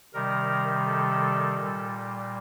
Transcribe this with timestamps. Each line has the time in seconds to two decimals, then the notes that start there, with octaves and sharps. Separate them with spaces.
0.14 C3 D#3 G3 A#4
0.86 A4
1.58 A#2 G3